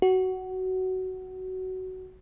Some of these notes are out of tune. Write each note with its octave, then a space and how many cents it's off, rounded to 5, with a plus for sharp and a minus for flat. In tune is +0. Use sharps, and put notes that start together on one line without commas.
F#4 +15